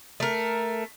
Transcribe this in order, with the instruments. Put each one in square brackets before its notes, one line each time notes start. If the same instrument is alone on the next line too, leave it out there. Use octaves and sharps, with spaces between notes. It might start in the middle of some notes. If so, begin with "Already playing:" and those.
[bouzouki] A3 A#4